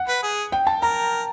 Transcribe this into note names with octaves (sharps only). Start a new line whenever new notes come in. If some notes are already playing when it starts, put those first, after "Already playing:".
Already playing: F#5
B4
G#4
G5
A5
A#4 A#5